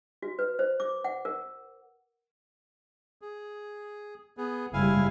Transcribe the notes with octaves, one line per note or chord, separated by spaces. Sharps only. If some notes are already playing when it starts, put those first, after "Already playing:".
F#4
B4
C5
D6
F#5
A#4
G#4
B3 G#4
F#1 G#2 G3 E4 F5 G#5